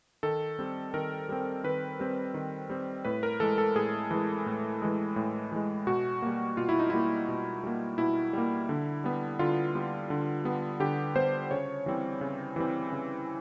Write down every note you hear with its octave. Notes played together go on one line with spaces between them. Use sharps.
D#3 A4
G3 C4
D#3 A#4
G3 C4
D#3 B4
G3 C4
D#3
G3 C4
A2 B4
A#4
E3 G#3 A4
A4
A2 G#4
E3 G#3
A2
E3 G#3
A2
E3 G#3
B2 F#4
G3 A#3
B2 F4
E4
D#4
G3 A#3 E4
B2
G3 A#3
B2 E4
G3 A#3
D3
G3 B3
D3 F4
G3 B3
D3
G3 B3
D3 G4
G3 B3 C5
C#3 C#5
E3 G3 C4
C#3
E3 G3 C4
C#3